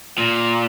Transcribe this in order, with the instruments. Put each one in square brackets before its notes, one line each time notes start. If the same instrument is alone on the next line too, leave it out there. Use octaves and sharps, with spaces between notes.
[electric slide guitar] A#2